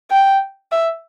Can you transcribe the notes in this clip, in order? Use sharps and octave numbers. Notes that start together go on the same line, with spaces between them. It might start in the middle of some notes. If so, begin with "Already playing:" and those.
G5
E5